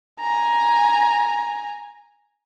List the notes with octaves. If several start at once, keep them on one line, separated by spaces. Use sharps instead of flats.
G#5 A#5